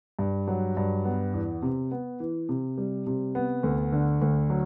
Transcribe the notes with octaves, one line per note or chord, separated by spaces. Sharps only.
G2
F#3
G2
B3
E2
C3
B3
E3
C3
G3
C3
B3
D2
D3
D2
F#3